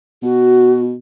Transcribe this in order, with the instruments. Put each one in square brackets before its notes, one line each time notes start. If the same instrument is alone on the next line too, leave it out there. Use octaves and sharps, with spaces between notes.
[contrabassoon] B2 [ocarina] F#4